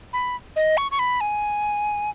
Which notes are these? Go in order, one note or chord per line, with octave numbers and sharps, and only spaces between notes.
B5
D#5
C#6
C#6
B5
G#5